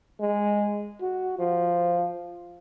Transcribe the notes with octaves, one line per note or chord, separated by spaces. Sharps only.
G#3
F#4
F3